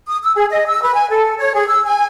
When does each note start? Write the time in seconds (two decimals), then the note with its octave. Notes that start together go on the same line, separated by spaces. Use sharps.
0.06 D#6
0.23 E6
0.36 G#4
0.50 D#5
0.67 E6
0.83 B4
0.95 G#5
1.09 A4
1.38 C#5
1.54 G#4
1.68 E6
1.85 G#5